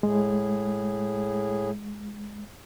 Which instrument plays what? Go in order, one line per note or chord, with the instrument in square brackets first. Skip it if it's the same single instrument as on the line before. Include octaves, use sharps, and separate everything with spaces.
[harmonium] A2 G#4 [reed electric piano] G#3